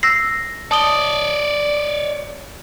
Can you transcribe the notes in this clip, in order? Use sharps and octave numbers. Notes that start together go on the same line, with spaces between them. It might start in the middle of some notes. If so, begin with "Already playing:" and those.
E6 A#6 C7
C#5 D5 A5 D#6 G7